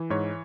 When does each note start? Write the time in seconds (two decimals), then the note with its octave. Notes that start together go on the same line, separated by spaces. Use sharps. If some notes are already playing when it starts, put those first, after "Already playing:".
Already playing: E3
0.10 G#2 C#5